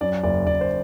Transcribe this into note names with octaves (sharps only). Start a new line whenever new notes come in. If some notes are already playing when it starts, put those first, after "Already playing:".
F#2 D5
F#1 D5
F#1 D5
C5